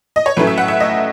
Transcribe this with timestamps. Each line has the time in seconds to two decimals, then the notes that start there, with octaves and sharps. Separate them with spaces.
0.16 D#5
0.26 C#5
0.37 A2 F#3 A3 C#4 B4
0.47 E5
0.58 F#5
0.68 E5
0.80 D#5